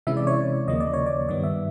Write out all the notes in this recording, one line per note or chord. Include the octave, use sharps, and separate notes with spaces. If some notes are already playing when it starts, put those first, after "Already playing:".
C3 E3 G#3 C#4 E4 E5
D5
C#5
D#2 C#3 F3 A#3 D#5
D5
C#5
D5
G2 D#3 G3 B3 D5
E5